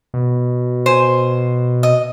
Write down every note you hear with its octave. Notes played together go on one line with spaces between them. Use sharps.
B2
C5 G#5
D#5